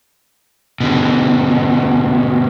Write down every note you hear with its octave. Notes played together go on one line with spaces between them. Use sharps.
B2 D3